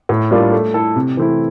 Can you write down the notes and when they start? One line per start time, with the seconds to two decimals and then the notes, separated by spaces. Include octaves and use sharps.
0.09 A2
0.31 G3 A#3 D4 F4
0.52 A3
0.74 E4 A4
0.96 C3
1.17 E3 A3 C4 E4